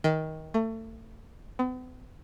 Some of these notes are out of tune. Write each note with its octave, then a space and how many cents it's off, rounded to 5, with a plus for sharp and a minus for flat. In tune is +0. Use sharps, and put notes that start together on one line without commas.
D#3 +20
A3 +30
B3 +45